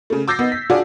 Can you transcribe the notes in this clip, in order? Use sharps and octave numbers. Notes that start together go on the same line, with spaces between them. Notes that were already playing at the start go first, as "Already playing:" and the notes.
C#3 A3
D6 E6 G6 A6 A#6 C7
B3 D#4
B6
D4 F4 F#4 G#4 D5